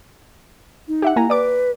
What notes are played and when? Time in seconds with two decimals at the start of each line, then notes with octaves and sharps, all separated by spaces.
0.88 D#4
1.02 G4 E5 F#5
1.16 A#3 E4 G#5 A#5
1.30 B4 D5 D6